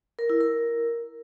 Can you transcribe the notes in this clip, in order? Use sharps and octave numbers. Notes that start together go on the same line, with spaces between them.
A#4
E4
A#4